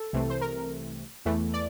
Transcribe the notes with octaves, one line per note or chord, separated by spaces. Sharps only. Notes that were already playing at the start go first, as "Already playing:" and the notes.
Already playing: A4
C2 C3 E3 A3 C4
C5
A#4
E2 E3 A3
D5